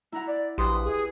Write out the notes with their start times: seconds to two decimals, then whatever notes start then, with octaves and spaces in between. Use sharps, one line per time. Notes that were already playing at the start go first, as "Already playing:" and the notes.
0.12 E4 F#5 A#5
0.27 D5
0.58 A#1 G4 B4 C6 D#6
0.84 G#4